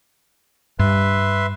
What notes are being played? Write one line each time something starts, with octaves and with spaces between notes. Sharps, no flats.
G2 B4 E5 C6